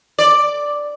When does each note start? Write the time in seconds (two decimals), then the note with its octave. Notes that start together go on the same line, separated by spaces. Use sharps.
0.19 D5